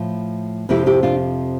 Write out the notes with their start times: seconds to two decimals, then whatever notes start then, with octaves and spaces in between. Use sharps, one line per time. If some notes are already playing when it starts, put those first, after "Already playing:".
Already playing: A2 F3
0.69 F2 C3 F3 E4 G4
0.86 E4 G4
1.03 D4 F4